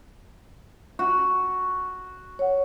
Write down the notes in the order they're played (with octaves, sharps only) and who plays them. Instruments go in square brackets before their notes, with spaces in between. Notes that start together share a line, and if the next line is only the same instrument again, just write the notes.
[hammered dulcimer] F#4
[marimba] C#5 F#5